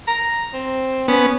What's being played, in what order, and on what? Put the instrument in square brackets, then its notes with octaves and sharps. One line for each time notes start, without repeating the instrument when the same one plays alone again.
[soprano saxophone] A#5
C4
[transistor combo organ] B3 [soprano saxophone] C#4